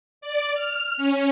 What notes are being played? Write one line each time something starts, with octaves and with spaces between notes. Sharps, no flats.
D5
F6
C#4